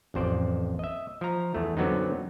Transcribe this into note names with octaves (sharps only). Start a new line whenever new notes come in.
A1 F2 C5 D5
D#5 E5
F3 A#5
E2 A3
F#2 D3 F#3 B3 C4 D#4